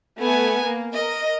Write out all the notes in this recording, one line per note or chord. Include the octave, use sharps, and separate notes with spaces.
A3 B3 G#5
A#3
A#4 D#5